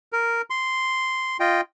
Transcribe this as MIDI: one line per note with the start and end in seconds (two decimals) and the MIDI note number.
0.12 0.42 70
0.50 1.37 84
1.40 1.61 65
1.40 1.61 75
1.40 1.61 79